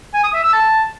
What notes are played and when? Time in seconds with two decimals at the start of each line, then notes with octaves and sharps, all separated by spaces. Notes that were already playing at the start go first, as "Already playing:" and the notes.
0.14 G#5
0.24 D#6
0.34 E5
0.43 E6
0.53 A5